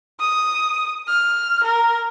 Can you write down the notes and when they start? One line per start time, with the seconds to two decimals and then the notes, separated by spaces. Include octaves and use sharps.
0.20 D#6
1.07 F6
1.63 A#4